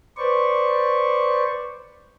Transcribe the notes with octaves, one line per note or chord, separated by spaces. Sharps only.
B4 C5 D5 C#6